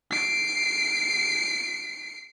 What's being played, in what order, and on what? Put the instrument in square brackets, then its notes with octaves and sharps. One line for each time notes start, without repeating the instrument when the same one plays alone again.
[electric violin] C7 D7